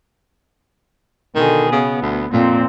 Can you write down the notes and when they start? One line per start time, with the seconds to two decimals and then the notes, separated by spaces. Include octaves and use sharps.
1.35 B2 D3 D#3 G#4
1.72 C#3 B3
2.02 D2
2.33 F2 A#2 C4